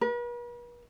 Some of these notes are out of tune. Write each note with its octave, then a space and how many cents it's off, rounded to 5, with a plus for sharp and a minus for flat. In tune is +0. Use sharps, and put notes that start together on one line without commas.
B4 -45